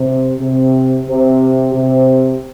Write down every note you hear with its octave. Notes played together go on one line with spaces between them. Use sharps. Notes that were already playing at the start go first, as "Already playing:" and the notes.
Already playing: C3
C3
C3
C3